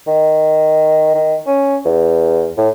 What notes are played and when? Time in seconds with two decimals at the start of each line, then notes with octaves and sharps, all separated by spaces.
0.07 D#3
1.15 D#3
1.47 C#4
1.85 E2
2.58 A2